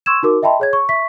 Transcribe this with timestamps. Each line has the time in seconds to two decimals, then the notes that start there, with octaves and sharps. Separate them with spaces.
0.06 C6 C#6 E6 G#6 E7
0.23 D#4 F#4 A#4 D6
0.43 D#5 E5 G5 A5 B5 C6
0.60 G#4 C#5 G#6
0.73 C#6
0.89 E5 C#6 B6